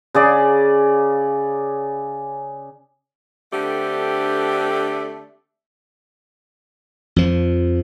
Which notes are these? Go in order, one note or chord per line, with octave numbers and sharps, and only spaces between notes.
C#3 G#4 D5
D3 A3 C4 D4 G4
F2 F3